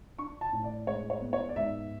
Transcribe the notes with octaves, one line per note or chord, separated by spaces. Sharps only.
D4 C#6
A5
A2
D5
G#3 C#5
C#5
B3
C#5
D5
G#2 E5